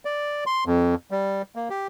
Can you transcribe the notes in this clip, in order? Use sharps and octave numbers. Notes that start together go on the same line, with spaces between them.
D5
C6
F2
G3
A#3
G4